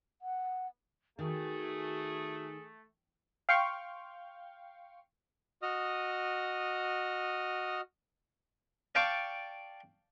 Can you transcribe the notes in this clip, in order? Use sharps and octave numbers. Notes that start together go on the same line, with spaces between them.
F#5
D#3 A3 F#4 G#4
F5 G5 C6 C#6
F#4 D#5 D#6 F6
D5 F5 G5 A5 C#6